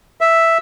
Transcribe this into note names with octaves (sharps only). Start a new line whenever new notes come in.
E5